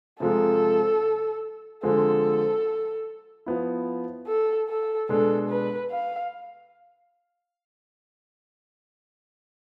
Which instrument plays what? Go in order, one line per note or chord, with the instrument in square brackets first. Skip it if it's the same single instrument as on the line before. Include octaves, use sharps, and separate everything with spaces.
[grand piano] C3 F3 G#3 [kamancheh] A4
[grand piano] D3 F3 G#3 C4 [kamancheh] A4
[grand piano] F3 B3 E4
[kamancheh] A4
A4
[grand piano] B2 G#3 D4 [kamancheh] A4
[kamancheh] B4
F5